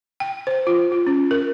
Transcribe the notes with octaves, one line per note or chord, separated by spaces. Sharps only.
G5
C5
F4
F4
C#4
A#4